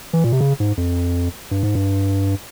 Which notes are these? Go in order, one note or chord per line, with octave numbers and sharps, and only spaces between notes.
E3
A#2
C3
C#3
G#2
F2
G2
G#2
G2